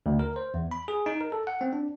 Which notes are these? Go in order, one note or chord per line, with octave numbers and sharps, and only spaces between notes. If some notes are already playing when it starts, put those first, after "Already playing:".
D2
A#4
C5
E2
B5
G#4
D#4
A#4
A4
F#5
C4
D4